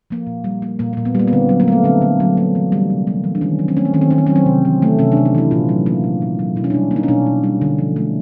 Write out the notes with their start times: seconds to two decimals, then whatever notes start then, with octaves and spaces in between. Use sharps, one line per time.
0.10 F3 A#3
0.27 A#2
0.44 G3
0.62 A#3
0.79 A#2 A#3
0.93 A#2 A#3
1.05 B3
1.15 G3 A#3
1.28 B3
1.33 D3 C4
1.49 F#3
1.60 A#3
1.68 A3 B3
1.84 D3 C4
2.01 D3
2.20 F#3
2.37 A#3
2.55 E3
2.72 G3
2.90 C3
3.07 A#3
3.24 E3
3.35 D4
3.41 D#3 C#4
3.59 F#3
3.68 C4
3.77 A3 C#4
3.85 C4
3.94 D#3 C#4
4.01 C4
4.11 D#3 C#4
4.18 C4
4.27 F#3 C#4
4.36 C4
4.46 C3
4.65 E3
4.82 A3
4.99 C3 C#4
5.12 D4
5.17 C3
5.25 D#4
5.35 E3 E4
5.51 A#2 F4
5.69 F#3
5.86 A#3
6.04 A#2
6.22 A#2
6.39 F#3
6.56 B2 E4
6.64 C#4
6.70 D4
6.75 G3
6.91 A#3
6.96 D#4
7.03 C#4
7.08 B2 D4
7.26 B2
7.44 G3
7.61 D3
7.79 F3
7.96 A3